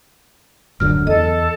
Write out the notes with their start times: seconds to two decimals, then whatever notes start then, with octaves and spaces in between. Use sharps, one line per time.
0.80 D1 F#2 D3 F6
1.07 E2 A4 D#5